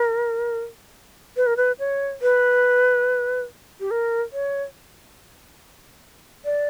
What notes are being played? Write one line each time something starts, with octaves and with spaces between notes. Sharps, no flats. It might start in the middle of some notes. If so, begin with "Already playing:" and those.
Already playing: A#4
B4
A#4
B4
C#5
B4
G4
A#4
C#5
D5